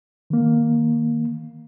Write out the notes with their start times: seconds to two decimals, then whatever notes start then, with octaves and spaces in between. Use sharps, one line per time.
0.30 D#3 A#3